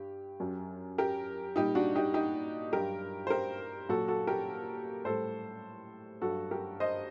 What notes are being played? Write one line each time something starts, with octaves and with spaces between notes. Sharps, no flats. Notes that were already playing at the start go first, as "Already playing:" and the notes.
Already playing: G2 G4
F#2 F#3
G4 A#4
A#2 G3 D#4 G4
D4 F#4
D#4 G4
D#4 G4
G2 F#3 G4 A#4
C5
G4 A#4
A#2 F#3 F#4 A4
F#4 A4
G4 A#4
A2 G3 A4 C5
G2 F#3 F#4 A4
G4 A#4
C5 D#5